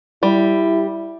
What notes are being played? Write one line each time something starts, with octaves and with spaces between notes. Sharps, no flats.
G3 E4